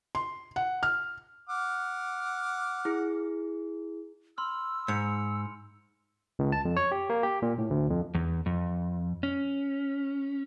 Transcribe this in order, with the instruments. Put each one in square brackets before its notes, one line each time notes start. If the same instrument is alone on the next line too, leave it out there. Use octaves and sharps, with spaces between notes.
[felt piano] C6
F#5
F6
[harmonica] F#5 D6 F6
[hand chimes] E4 G#4
[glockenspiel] B5 C6 F6 [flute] E6
[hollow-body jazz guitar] G#2 [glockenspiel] C#7 F7
[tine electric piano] C#2
A5
F2
C#5
G4
A#3
G4
A#2
A2
D2
F2
[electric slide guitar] E2
F2
C#4